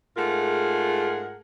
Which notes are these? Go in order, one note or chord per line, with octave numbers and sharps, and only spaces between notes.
G#2 A3 F4 G#4 A#4 F#5